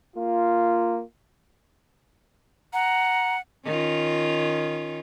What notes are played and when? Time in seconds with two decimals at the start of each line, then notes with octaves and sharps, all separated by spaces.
0.16 A#3 F4
2.73 F#5 A#5
3.65 D#3 C#4 F4